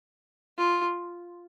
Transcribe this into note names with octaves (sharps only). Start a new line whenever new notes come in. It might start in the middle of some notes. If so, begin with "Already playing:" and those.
F4